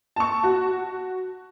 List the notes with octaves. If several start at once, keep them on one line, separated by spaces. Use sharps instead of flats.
A5 C#6
F#4